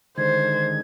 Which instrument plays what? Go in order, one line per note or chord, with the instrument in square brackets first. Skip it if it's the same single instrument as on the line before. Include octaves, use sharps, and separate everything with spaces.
[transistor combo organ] D3 D#3 G#3 [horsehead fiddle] C5 [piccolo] G#6